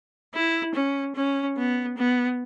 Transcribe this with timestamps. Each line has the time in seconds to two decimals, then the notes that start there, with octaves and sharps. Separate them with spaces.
0.34 E4
0.75 C#4
1.16 C#4
1.57 B3
1.98 B3